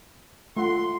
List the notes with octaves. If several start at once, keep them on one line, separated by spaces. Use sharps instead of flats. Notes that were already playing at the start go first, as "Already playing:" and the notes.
A3 F4 F#5 C6